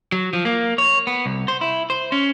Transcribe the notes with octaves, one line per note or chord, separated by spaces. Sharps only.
F#3
F3
A#3
C#5
B3
C2
C5
E4
C5
C#4